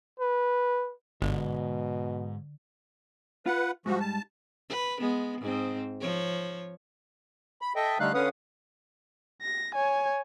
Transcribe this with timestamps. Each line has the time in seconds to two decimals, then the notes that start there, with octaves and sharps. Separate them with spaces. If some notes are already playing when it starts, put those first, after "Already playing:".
0.20 B4
1.22 G1 G#2 B2 D3
3.46 F4 B4 F#5
3.86 G#2 F3 G3 F#4
4.00 A5
4.70 B4
5.00 G#3 B3
5.41 G#2 C4
6.00 F3 C#5
7.62 B5
7.76 A4 D#5 E5 G5
8.00 D3 G3 A3 D#4 F5 F#6
8.14 D3 C#4 B4 F5 F#5 D#6
9.42 A#6
9.75 C#5 G#5